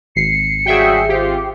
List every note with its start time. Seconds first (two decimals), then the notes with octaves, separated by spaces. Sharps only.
0.16 G#1 C7 C#7
0.66 C#3 G3 F#4 G#4 E5 G5
1.09 C4 F4 G4